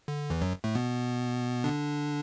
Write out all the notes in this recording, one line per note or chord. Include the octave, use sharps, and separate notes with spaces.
D3
E2 E3
F#2 F#3
A2 A3
B2 B3
D3 D4